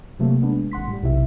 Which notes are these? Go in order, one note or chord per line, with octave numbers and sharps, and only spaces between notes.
C3 F#3 A3 A#3
G#3 B3 D4
G#1 F#5 C6 B6
A2 G3
B1 C3 E4 E5